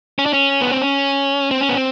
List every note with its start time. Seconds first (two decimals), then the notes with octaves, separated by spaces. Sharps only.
0.19 C#4
0.26 D4
0.33 C#4
0.62 B3
0.72 C4
0.82 C#4
1.51 C4
1.61 C#4
1.69 B3
1.76 C4